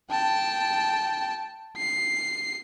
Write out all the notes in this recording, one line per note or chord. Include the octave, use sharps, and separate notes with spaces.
G5 A5
C7